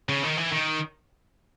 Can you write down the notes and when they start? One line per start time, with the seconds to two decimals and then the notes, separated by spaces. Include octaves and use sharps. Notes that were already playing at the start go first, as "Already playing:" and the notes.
0.09 C#3
0.23 D#3
0.37 E3
0.52 D#3